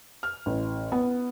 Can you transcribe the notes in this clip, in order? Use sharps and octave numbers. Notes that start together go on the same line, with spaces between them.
F6
A1
B3